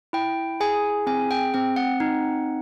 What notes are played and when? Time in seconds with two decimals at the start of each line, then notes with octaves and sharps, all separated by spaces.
0.13 E4 G5
0.60 G#4 G#5
1.07 C4 G#5
1.31 G5
1.54 C4 G5
1.76 F#5
2.00 D#4